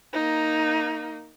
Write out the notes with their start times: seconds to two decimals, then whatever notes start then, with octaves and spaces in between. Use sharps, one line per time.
0.13 A#3 D#4